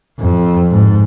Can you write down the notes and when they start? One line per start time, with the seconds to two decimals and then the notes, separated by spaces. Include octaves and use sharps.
0.20 F2
0.71 G#2